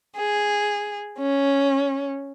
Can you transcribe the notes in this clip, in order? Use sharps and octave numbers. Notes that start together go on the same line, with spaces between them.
G#4
C#4